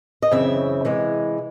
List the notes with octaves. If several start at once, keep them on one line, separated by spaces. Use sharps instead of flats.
D#5
F#2 C#3 E3 C4 E5
C3 E3 G#3